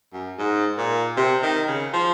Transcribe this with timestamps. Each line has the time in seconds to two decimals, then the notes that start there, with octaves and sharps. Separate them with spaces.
0.13 F#2
0.38 G#2
0.77 A#2
1.17 C3
1.42 D#3
1.67 C#3
1.93 F3